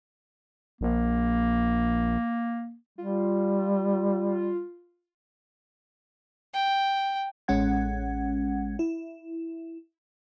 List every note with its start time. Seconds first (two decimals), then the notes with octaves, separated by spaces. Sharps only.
0.81 A#1 A#3
2.98 G3 F4
6.54 G5
7.48 A1 G#3 C#4 F#5 G#6
8.79 E4